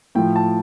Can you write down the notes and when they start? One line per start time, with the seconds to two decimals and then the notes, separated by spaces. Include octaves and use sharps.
0.15 A2 F3 G5
0.36 A5